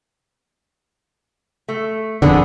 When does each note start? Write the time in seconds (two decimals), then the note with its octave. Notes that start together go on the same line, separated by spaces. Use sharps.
1.68 A3
2.22 E1 F2 D3 B3 D4 G#4